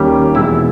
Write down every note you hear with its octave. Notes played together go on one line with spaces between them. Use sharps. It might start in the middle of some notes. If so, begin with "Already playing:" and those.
Already playing: D#2 D#3 G3 A#3 C#4 G4
E2 B2 G#3 E4